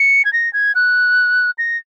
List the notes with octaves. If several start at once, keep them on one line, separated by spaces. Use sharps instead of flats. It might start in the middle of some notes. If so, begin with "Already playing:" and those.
Already playing: C#7
G#6
A#6
G#6
F#6
A#6